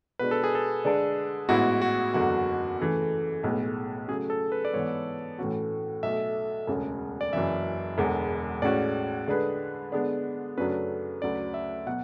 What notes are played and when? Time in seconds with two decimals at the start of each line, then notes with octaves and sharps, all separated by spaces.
0.19 B2 G#3 D4 B4
0.31 A4
0.44 G#4
0.55 A4
0.84 D3 G#3 D4 A4 D5
1.49 A1 G#2 G#3 B3 E4 F#4
1.82 F#4
2.14 F#1 E2 D3 F#3 F#4
2.80 C#3 E3 A3
3.43 B1 A2 G#3 B3
4.08 C#3 F#3 A3 G#4
4.30 A4
4.52 B4
4.65 D5
4.73 G#2 E3 B3 C#5
5.38 A2 E3 A3 C#4 F#4
6.03 B1 B2 A3 E5
6.67 E1 D2 C#3
7.21 D5
7.33 F#1 F#2 E3 E5
7.98 E1 E2 D3 G#3
8.62 A2 G#3 C#4 F#4 D5
9.27 D3 G#3 D4 G#4 B4
9.92 D3 G#3 B3 D4
10.57 F#2 C#3 F#3 A3 D4 B4
11.22 D2 C#3 F#3 D5
11.54 E5
11.86 B2 F#3 F#5